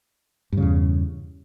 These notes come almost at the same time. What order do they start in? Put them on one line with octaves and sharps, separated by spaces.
G2 C#3 E2